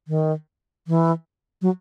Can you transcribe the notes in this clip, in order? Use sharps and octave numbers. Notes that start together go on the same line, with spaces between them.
D#3
E3
F#3